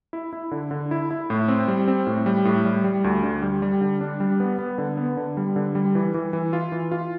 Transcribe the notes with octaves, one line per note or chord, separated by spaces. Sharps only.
E4
E4
D3
D3
E4
E4
A2
C4
G3
C4
A2
G3
A2
G3
G3
D2
D3
G3
G3
D3
D4
G3
B3
B3
D3
B3
D3
G3
D3
G3
E3
E3
E3
F4
E3
F4